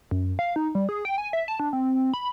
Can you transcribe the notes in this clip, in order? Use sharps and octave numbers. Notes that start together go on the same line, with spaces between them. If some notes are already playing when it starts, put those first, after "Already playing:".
F#2
F5
D#4
G3
G#4
G5
G#5
E5
A5
D4
C4
B5